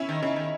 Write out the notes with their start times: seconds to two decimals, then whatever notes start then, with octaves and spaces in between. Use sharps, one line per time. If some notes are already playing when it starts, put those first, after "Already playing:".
Already playing: C#4 E4
0.09 D#3
0.22 C#3 C#4 E4
0.36 D#3